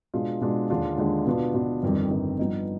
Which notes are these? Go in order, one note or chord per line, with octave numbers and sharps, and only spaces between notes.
B2 G#3 D4 F4
B2 G#3 D4 F4
D#2 D3 G#3 D4 F4
D#2 D3 G#3 D4 F4
B2 B3 D4 F4
B2 B3 D4 F4
G1 F2 D#3 G3
G1 F2 D#3 G3
G2 F3 B3 D#4